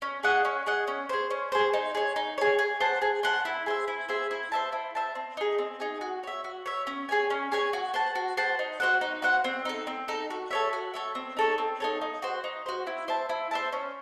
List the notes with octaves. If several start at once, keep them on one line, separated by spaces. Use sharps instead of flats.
C#4
G#4 D#5 F#5
C#4
G#4 D#5 F#5
C#4
G#4 C5
C#4
G#4 C5
D#4
G#4 C#5
D#4
G#4 C#5
G#4
C5 F#5 A5
G#4
C5 F#5 A5
E4
G#4 C5 E5
E4
G#4 C5 E5
E4
C5 E5 A5
E4
C5 E5 A5
C4
D#4 G#4
C4
D#4 G#4
F#4
C#5 E5
F#4
C#5 E5
C#4
G#4 C#5 G#5
C#4
G#4 C#5 G#5
F#4
C5 F#5 A5
F#4
C5 F#5 A5
D#4
F#4 C5 F#5
D#4
F#4 C5 F#5
C4
D#4 A4
C4
D#4 A4
F#4
A4 C#5 E5
F#4
A4 C#5 E5
C4
D#4 A4 C#5
C4
D#4 A4 C#5
D#4
F#4 C5
D#4
F#4 C5
E4
C5 E5 A5
E4
C5 E5 A5
C#4